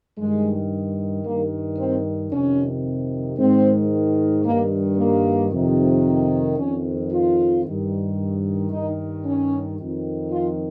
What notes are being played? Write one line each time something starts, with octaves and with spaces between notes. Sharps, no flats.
G2 D#3 G#3
G2 D#3 A#3
C4
F2 C3 D#3 C#4
G#2 D#3 C4
G2 D#3 A#3
A#3
F2 C3 D#3
F2 D#3 C#4
F4
G2 D#3
G2 D#3 D#4
C#4
F2 D#3
F4